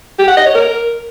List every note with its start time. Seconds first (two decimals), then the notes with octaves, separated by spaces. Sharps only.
0.19 G4
0.28 F#5
0.37 D#5
0.46 C#5
0.55 A#4